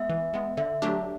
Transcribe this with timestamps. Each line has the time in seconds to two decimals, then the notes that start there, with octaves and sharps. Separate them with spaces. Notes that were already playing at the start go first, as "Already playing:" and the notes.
Already playing: G#3 B3 E5
0.09 E3
0.33 G#3 B3
0.57 D3 E5
0.82 F#3 A3 D4 G4